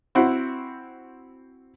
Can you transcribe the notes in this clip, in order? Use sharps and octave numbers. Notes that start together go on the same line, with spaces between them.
C4 E4 F#4 C5 F#5